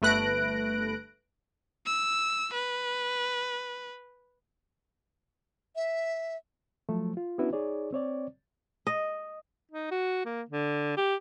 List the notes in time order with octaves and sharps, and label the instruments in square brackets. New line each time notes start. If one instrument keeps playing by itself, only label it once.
[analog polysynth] G1 A3 B4 F#6 A#6 D7
[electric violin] E6
B4
[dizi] E5
[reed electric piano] F3 F#3 A3
F4
B3 C#4 D4 E4 F#4 B4
D#4 G#4 C#5 D5
C4 C#5 D5
[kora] D#5
[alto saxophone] D#4
F#4
A#3
D3
G4